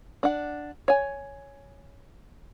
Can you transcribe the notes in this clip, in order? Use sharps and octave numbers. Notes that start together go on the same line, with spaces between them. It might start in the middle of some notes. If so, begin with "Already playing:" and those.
D4 F#5
C#5 G#5